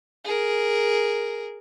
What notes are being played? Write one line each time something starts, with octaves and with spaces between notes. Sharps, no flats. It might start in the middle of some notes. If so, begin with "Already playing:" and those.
G#4 A#4